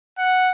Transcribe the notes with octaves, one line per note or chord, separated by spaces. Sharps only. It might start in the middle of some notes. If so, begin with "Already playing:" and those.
F#5